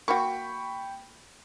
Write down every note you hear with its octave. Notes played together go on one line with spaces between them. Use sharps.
A#3 F#4 G5 B5 C#6